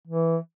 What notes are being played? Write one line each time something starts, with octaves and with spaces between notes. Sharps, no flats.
E3